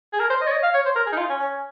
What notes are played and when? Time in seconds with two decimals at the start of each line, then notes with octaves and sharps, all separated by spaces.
0.13 G#4
0.19 A#4
0.30 C5
0.41 D#5
0.47 C#5
0.52 D#5
0.63 F5
0.74 C#5
0.85 C5
0.96 A#4
1.06 G#4
1.12 D#4
1.17 F4
1.29 C#4
1.39 C#4